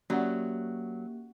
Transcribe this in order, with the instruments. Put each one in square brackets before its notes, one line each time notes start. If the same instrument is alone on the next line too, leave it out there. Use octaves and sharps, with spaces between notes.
[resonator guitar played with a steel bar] F#3 [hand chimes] A#3 G4 [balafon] C#4 D5 F#5